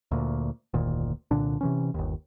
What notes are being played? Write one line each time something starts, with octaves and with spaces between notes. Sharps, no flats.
D2 A#2
F1 D2 A#2 D#3
C2 A#2 D3 D4
C3 E3 C#4
G1 D#2